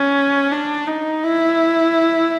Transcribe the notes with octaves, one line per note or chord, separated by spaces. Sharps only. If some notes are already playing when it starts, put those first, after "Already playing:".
Already playing: C#4
D4
D#4
E4